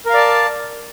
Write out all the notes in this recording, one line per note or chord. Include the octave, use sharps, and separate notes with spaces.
A#4 D5 F5 A5